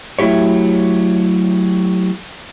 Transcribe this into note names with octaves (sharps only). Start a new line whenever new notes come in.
F#3 A3 E4 G4 C#5